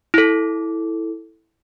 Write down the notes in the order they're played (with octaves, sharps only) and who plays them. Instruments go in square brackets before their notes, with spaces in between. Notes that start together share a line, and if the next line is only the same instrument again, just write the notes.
[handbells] E4 A4